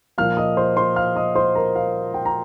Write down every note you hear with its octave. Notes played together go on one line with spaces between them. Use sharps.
A#2 F3 A#3 F5 F6
D#5 D#6
C5 C6
C5 C6
F5 F6
D#5 D#6
C5 C6
A#4 A#5
F5
G5
A#5